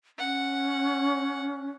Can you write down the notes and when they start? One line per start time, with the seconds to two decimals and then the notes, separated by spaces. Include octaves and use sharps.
0.18 C#4 F#5